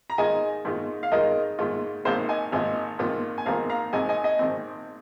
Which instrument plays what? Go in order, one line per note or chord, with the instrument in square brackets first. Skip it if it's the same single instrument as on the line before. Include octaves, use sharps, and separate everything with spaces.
[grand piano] A#5
[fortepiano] G#2 D#3 G#3 F4 [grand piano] D#5 G#5
[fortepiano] G#2 D#3 G#3 F4
[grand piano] F5
[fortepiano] G#2 D#3 G#3 F4 [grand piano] A#4 D#5
[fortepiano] G#2 D#3 G#3 F4
[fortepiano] G#1 G#2 D#3 A#3 F4 [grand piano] C5 F5
[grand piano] D#5 G#5
[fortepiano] G#1 G#2 D#3 A#3 F4 [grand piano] D#5 G#5
[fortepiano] G#1 G#2 D#3 A#3 F4
[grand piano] G#5
[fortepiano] G#1 G#2 D#3 A#3 F4 [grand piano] F5 A#5
[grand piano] F5 A#5
[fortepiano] G#1 G#2 D#3 C4 [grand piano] D#5 G#5
[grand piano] D#5 G#5
D#5 G#5
[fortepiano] G#1 G#2 D#3 C4